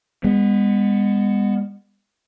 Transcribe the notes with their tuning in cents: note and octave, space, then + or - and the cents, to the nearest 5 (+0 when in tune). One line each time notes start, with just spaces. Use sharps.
G#3 -40 B3 +0